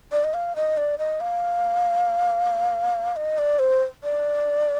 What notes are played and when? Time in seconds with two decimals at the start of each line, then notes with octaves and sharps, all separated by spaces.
0.12 D5
0.24 D#5
0.34 F5
0.56 D#5
0.77 D5
0.98 D#5
1.20 F5
3.16 D#5
3.38 D5
3.59 C5
4.03 D5